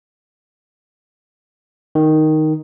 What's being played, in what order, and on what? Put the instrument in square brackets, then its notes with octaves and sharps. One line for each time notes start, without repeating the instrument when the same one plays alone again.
[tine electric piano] D#3